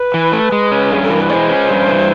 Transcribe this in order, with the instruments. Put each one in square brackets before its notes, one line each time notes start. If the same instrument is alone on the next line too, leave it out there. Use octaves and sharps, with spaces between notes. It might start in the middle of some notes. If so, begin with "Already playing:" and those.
Already playing: [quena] B4
[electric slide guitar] E3
A3
G#3
C#4
[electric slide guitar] G2 [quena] G#4
[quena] A4
[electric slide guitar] E3 [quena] A#4
[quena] B4
[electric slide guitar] G#3 [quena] C5 D5
[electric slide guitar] C#4
G2
E3